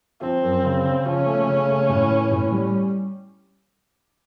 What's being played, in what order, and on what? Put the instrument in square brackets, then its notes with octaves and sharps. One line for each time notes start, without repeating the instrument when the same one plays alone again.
[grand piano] F3 [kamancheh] C4
[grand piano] F#2
C#3
C#3
[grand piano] F3 [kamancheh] C#4
[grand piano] A3
C#3
A3
A2
E3
A2
G3